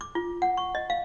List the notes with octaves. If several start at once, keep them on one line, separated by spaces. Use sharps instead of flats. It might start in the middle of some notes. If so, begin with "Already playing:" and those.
D6
F4
F#5
C#6
D#5
F5